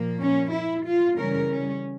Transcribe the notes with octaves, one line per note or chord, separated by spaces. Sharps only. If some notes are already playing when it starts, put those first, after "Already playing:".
Already playing: A#2 F3 A#3
C#4
E4
F4
C#3 E3 G3 C#4 A#4
C#4